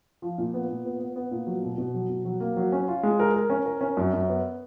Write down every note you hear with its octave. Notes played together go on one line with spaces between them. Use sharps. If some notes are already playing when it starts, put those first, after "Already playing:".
F3
A#2
B3
A#2
B3
B3
B3
A#2
F#3
B2
B2
F#3
B2
F#3
A#3
F#3
C#4
F4
G#3
A#4
A#4
C#4
A#4
C#4
F#2
F#2
B3